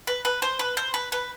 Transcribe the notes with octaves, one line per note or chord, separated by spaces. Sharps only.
B4
B4
C5
B4
C5
B4
B4